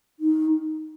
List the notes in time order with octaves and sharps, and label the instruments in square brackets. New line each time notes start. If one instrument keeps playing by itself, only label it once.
[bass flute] D#4